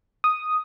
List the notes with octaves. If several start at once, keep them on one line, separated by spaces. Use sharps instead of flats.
D#6